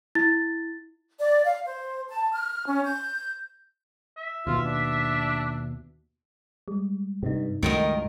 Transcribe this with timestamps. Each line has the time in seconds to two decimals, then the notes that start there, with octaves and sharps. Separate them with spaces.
0.15 E4 A6
1.19 D5
1.44 F5
1.65 C5
2.08 A5
2.32 F6
2.65 C#4
2.84 G6
4.17 E5
4.47 D#2 B2 F4
4.64 D4
6.68 G3 G#3
7.23 G2 C3 D#4
7.63 C#2 G2 D#3 A3 F#4 A#4 D#5